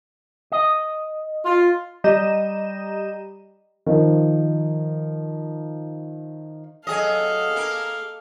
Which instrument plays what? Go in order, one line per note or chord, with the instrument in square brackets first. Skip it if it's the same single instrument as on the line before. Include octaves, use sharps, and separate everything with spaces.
[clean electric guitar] D#5
[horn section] F4
[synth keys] G3 D#5 A#5 G6 D#7 E7
[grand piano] D#3 F3
[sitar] F#3 G#4 D#5 [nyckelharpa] A4 F5
[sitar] A#3 A#4